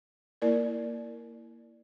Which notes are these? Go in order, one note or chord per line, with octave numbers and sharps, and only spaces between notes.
A#3 E4 A#4 D5